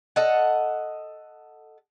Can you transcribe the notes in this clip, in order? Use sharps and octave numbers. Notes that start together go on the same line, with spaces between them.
A4 D#5 F#5